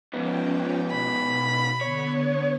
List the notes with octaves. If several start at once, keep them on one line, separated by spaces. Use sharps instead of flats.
G#2 F3 B3 C#4 G5
B2 B5
D3 B3 C#5